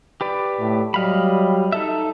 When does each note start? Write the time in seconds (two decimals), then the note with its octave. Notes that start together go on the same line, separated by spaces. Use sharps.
0.21 G4 B4 D5
0.59 A2
0.94 F#3 G3 D#5 F5 B5
1.72 D#4 A4 E5